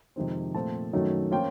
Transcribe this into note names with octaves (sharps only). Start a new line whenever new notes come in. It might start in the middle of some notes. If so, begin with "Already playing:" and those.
F2 C3 D#3 G#3 C4
A#2 F3 A3 C4 A5
F#2 D#3 F#3 A3 C#4
F3 A#3 C#4 F4 G5